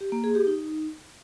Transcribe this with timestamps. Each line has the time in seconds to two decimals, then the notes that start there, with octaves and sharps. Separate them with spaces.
0.01 G4
0.12 A#3
0.24 G#4
0.35 G4
0.47 D#4